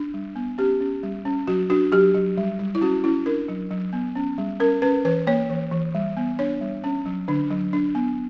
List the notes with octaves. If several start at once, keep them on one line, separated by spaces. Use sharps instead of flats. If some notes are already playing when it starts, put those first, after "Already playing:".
Already playing: D4
G3
B3
C#4 G4
C#4
G3
C#4
F#3 F#4
D4 F#4
F#3 G4
F#3
G3
G3
E4
C#4 F#4
C#4 E4
D4 A#4
F#3
F#3
B3
C#4
G3
C#4 A#4
C#4 B4
E3 B4
A#3 C#5
E3
E3
G3
B3
D4 C#5
G3
C#4
F#3
D3 D4
F#3
D4
B3